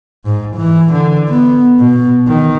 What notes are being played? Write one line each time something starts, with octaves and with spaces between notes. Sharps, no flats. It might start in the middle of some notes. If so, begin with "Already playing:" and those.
G#2
E3
D3
B3
B2
D#3